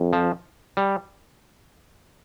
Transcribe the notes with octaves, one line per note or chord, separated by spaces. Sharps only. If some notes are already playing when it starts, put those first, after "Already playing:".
Already playing: F2
F3
G3